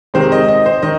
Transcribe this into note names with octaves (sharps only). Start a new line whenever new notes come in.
C3 D#3 G#3 C4 C5
D#5
D#5
C5
D#3 D#5